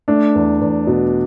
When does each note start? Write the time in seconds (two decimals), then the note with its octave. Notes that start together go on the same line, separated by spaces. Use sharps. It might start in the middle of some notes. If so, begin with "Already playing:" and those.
0.08 A3 D4
0.35 E2
0.61 E2
0.87 B2